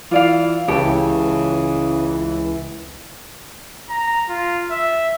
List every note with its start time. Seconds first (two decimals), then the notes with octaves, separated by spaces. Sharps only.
0.11 E3 F4 D5 F5
0.68 C#2 C#3 E3 G4 C#5 A5
3.90 A#5
4.30 F4
4.71 E5